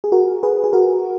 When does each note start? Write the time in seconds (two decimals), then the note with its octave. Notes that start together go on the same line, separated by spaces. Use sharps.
0.04 G#4
0.12 F#4 A#4
0.43 G#4 B4
0.64 G#4
0.73 F#4 A#4